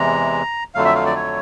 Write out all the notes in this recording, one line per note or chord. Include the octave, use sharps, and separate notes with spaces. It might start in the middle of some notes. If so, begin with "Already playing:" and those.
Already playing: E2 C3 E3 G#3 A#5
F2 D3 F#3 A3 F5
E5
F5
D5
C#5